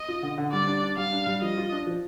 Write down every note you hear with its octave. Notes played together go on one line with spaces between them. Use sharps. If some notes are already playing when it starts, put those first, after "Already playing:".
Already playing: D#5
F4
D3
D3
G3 D5
D4
D4
G3 F5
D4
G3
F3 D#5
F4
D4
F3